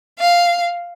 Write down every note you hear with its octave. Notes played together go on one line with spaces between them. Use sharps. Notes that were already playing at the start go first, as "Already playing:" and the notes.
F5